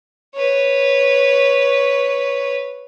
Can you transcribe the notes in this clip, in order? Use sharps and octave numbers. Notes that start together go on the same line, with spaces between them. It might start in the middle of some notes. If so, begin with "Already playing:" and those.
B4 C#5